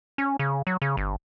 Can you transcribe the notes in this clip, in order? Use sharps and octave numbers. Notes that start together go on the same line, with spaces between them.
C#4
C#3
F#3
C#3
G1